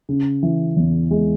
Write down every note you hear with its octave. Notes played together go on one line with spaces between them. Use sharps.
C#3
E3
E2
G#3